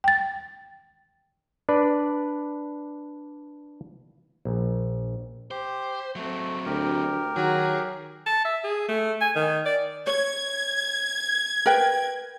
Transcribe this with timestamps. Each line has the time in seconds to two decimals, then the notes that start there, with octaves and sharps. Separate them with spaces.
0.04 G5 A6
1.69 D4 B4 D5
4.45 A#1
5.51 G4 C5
6.16 F#3 A3 C4
6.66 D2 G4 A#4
7.36 D#3 F#3 G#4
8.26 A5
8.45 E5
8.64 G#4
8.88 A3
9.21 G#5
9.36 D#3
9.65 D5
10.07 C#5 G#6
11.66 A#4 B4 G5